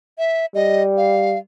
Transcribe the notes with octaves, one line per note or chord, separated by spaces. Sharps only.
E5
G3 D#5
F5